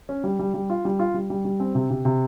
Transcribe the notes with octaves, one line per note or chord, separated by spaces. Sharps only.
C#4
G3
G3
G3
F4
G3
F4
G3
G3
G3
C4
C3
C3
C3